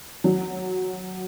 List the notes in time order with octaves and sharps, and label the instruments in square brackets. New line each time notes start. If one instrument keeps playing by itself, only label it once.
[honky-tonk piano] F#3